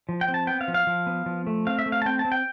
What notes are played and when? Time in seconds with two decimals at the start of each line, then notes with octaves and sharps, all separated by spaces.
0.09 F3
0.21 G5
0.28 C4
0.34 A5
0.47 B3 G5
0.61 F5
0.68 F3
0.74 F5
0.87 F3
1.07 B3
1.26 F3
1.47 A3
1.67 C4 F5
1.79 E5
1.86 A3
1.92 F5
2.02 A5
2.06 C4 G5
2.19 A5
2.25 C4
2.32 G5